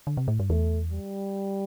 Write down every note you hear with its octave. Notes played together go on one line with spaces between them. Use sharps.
D3
C3
A2
G2
E2 A3
G3